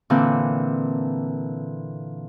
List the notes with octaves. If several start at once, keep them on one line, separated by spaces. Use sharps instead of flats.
A#2 D3 E3 A#3 C4